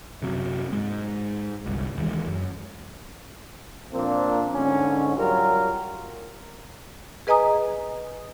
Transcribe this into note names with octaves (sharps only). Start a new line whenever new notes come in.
F#2 C3 F#3
G#2 G#3
G1 C2 G3
D#2 E3 G#3
F#2
A#2 F3 A#3 C4 D4
G#2 D3 C#4
F#3 G3 F4 A#4
G#4 B4 D#5 G#5 A#5 D#6